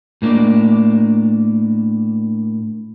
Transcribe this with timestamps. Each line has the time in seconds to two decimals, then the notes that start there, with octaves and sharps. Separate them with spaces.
0.22 A2 A#3 D4